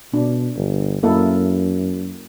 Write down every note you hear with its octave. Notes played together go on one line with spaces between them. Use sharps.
B2 D4
G1
F#2 A#3 E4 A4